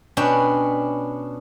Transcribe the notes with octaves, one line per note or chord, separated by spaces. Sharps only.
B2 C#4 D4 B4 G5